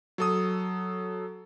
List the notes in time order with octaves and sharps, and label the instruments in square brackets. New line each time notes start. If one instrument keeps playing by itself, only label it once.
[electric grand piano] F#3 A4 D#6